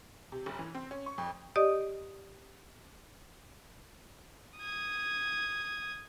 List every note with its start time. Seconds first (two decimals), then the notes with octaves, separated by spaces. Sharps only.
0.32 C3
0.46 G1
0.59 E3
0.75 C4
0.91 C#4
1.06 C#6
1.18 F2
1.56 G4 D5 D#5 D#6
4.58 D#6 G#6